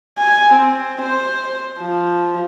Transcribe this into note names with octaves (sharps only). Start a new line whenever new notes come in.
G#5
C4
C5
F3